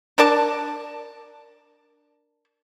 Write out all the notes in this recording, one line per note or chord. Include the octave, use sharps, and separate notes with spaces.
D4 A#4 D5 A5